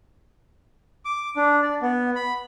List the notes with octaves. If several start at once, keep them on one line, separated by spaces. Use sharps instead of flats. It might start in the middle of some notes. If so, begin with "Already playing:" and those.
D6
D4
D5
B3
B5